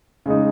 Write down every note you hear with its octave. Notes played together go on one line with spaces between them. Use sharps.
C#3 G#3 D#4